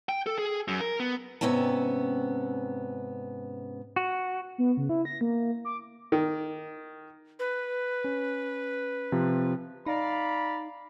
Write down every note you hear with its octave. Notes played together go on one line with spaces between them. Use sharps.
G5
A4
G#4
F#2
A#4
B3
G#2 C3 B3 C#4 E5 A5
F#4
B3
C#3
E4
A#6
A#3
D6
D#3
B4
C#4
C3 F3
D#4 D5 F5 A#5 B5